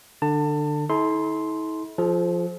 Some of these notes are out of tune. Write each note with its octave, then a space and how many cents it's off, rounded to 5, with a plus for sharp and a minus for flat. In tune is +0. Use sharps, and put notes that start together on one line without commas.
D3 +20 A5 +25
E4 -45 A4 -35 C6 +0
F3 +0 A4 -45